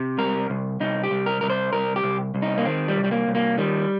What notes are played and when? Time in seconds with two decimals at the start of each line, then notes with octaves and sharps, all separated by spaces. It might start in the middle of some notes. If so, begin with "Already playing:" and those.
Already playing: C3
0.18 C2 A#4
0.50 C2
0.80 C2 D#4
1.03 G4
1.11 C2
1.26 A#4
1.41 C2 A#4
1.50 C5
1.73 C2 A#4
1.96 G4
2.04 C2
2.34 C2
2.42 D#4
2.57 A#3
2.65 D#3 C4
2.88 G3
2.97 C2
3.04 G3
3.11 A#3
3.28 C2
3.35 A#3
3.58 D#3 G3